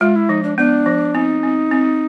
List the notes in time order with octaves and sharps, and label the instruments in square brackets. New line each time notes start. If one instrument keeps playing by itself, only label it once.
[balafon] G#3 [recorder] F4
[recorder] E4
[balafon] F3 [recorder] D#4
[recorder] D4
[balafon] B3 [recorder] D4
[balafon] F3
[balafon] C4 [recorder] D#4
[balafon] C4
C4